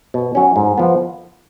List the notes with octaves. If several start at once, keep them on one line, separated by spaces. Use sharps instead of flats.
B2
F#3 C#4
G#2
F3 B3